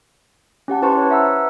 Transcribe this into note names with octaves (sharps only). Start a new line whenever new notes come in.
C#4 G4 F#5 A5
E4 B4 C5 A5 C6 C#6
B4 C#5
E5 F#5 A#5 E6